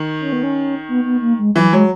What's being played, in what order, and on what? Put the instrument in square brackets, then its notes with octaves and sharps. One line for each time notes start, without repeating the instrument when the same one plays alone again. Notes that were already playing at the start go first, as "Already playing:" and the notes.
Already playing: [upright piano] D#3
[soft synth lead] C#4
B3
C#4
B3
B3
A#3
G#3
[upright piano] E3 [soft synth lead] F#3
[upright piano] F#3 [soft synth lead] G#3